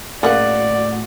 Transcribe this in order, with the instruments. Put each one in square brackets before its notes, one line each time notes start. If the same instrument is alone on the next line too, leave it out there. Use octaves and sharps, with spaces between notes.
[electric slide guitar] A2 A3 F#4 [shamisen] C#3 A#3 F#5 [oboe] D5